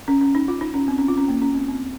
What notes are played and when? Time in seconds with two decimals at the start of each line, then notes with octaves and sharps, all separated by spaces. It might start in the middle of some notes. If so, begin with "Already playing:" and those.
0.08 C#4
0.21 C#4
0.35 D#4
0.48 F4
0.61 D#4
0.74 C#4
0.88 C4
0.98 C#4
1.08 F4
1.18 C#4
1.28 A#3
1.42 C#4
1.55 C4
1.69 C4